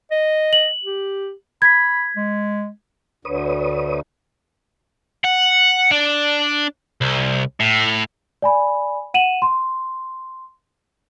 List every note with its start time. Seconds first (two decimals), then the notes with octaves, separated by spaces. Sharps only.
0.11 D#5
0.53 F#7
0.84 G4
1.62 B5 G#6 B6
2.16 G#3
3.25 D2 D3 B4 C#5 D#6
5.25 F#5
5.91 D4
7.01 C2
7.60 A2
8.42 D5 G#5 B5
9.14 F#5 D#7 E7 F#7
9.42 C6